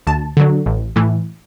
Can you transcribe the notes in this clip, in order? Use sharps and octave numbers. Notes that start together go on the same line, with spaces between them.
D2 A5
D3 F#3
A1
A2 E3